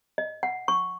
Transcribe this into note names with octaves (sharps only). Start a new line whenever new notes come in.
D#5
F#5
C#6